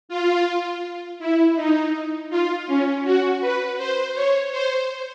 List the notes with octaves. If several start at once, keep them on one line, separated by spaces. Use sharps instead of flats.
F4
E4
D#4
F4
C#4
F#4
B4
C5
C#5
C5